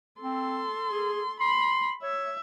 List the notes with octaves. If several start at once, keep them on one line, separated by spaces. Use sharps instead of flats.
C4 A4 C6
G#4
B5 C6
C#5 E5